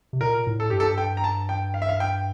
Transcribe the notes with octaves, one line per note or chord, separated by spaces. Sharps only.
C3
A#2 A#4
A2
A4
G2 G4
A4
G5
A#5
A5
G5
F5
E5
F5
G5